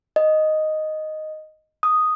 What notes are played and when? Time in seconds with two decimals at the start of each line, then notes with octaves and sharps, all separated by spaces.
0.16 D#5
1.83 D#6